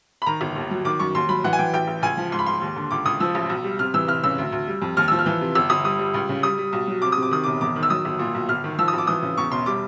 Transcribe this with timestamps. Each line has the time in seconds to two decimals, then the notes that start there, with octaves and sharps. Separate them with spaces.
0.22 B5
0.26 D#3 A#5
0.41 G1
0.56 D#2
0.71 F#3
0.85 D#3 D6
0.99 F#2 C#6
1.15 D#2 C6
1.29 F#3 B5
1.44 E3 F#5
1.53 G#5
1.59 E3 G5
1.74 A1 G5
1.88 A1
2.02 C#2 G#5
2.17 F3
2.32 G#2 C6
2.39 B5
2.46 G#2 C6
2.61 D#2
2.76 D3
2.91 C#2 D6
3.05 C#2 D#6
3.20 F3 E6
3.35 A1
3.49 B1
3.64 G3
3.79 C3 F6
3.94 E3 E6
4.08 F1 F6
4.24 C#3 E6
4.38 D2
4.52 D2
4.67 G3
4.82 F2
4.97 D#2 F6
5.08 F3 E6
5.19 F6
5.26 E3
5.41 C3
5.55 G1 E6
5.70 G1 D#6
5.84 G3 D#6
5.99 G3
6.14 C#2
6.29 C#3
6.43 G3 D#6
6.58 G3
6.73 B1
6.87 F#3
7.02 C3 D6
7.12 C3 D#6
7.23 D6
7.31 D#3 D#6
7.44 E1 D6
7.61 E2 D6
7.76 D#3
7.83 E6
7.90 F#3 D#6
8.05 G1
8.19 A#2
8.34 B1
8.49 G1 F6
8.64 D#3
8.78 F3 E6
8.88 D#6
8.93 G#1
8.98 D6
9.07 E3 D#6
9.22 C#3
9.37 E2 C#6
9.51 E1 C6
9.66 G3 D6